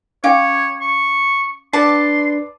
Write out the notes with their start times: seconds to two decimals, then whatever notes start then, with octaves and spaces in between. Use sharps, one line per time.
0.24 C#4 C#5 F5 G5 D6
0.81 C#6
1.73 D4 B4 D5 A5 C6